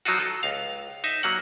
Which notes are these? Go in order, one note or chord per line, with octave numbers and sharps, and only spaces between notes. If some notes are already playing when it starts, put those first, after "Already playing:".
F3 F#3 D#4 F4 F#4
A4
C#2 F5
D#4 E5
F#3 A#3 F#5